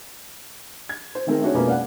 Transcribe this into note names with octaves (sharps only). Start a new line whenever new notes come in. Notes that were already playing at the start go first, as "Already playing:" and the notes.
G#6
C5
D#3 A3 C4 D#4 G#4 A#4
A3 D4 F#4 G#4 C#5
F2 B2 G#3 A#3 B3 C#4
D5 F5 F#5